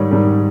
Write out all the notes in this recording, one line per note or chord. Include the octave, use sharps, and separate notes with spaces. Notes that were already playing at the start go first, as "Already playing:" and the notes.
Already playing: G#2 D#3 G3 C#5
G#2 D#3 G3